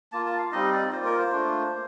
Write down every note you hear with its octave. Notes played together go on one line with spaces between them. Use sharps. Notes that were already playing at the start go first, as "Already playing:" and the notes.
A#3 F4 A5
A5
F5
G3 C4 D#4 D#5
D5
A#3 F4 C5
A#4
C5
A3 D4 F4
A#3